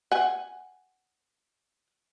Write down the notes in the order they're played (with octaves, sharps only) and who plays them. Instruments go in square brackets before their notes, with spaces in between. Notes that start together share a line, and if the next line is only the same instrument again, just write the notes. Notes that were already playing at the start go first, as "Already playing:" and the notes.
[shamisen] F#5 G#5